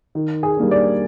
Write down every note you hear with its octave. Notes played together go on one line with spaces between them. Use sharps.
D#3
G#4 G#5
G3 A#3 D4
D5